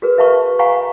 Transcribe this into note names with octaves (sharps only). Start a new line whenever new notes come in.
F#4 G#4 A#4 B4
B4 E5 F5 A5 B5 C#6
F5 F#5 G#5 A#5 B5 C#6